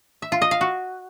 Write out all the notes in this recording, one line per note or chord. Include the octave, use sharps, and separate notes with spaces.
E5
F4
D#5
F5
F#4